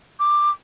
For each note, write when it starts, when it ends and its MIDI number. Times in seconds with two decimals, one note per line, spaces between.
0.19 0.50 86